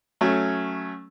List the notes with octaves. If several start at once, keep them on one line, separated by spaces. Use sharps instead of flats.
F#3 A3 C#4